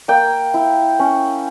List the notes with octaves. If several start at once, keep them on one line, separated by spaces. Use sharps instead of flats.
A#3 G5
E4
C#4